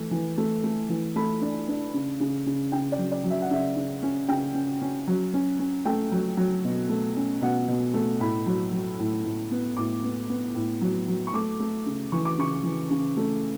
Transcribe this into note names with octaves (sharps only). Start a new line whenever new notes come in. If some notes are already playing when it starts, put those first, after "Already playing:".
Already playing: E3 A3
E3
A3
A3
E3
A3 B5
D4
D4
C#3
C#3
C#3
C#3 G5
D5
F#3
D5
F#3
E5
F#5
C#3 E5
C#3
C#4
C#3 G5
C#4
C#4
F#3
C#4
C#4
A3 G5
F#3
F#3
B2
A3
C#4
B2 F#5
B2
A3
A2 B5
F#3
F#3
A2
A2
B3
A2 D6
B3
B3
A2
F#3
F#3
C#6
A3 D6
A3
C#3
E3 C#6
D6
C#3 C#6
E3
C#3
A3